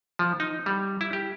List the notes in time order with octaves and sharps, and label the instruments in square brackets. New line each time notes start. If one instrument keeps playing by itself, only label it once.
[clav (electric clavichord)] F3
D#4
G3
E4
G4